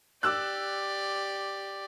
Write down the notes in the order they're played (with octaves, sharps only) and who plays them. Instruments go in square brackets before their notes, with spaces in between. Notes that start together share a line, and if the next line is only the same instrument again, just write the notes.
[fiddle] G4 D5 [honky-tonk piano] D6 E6 F#6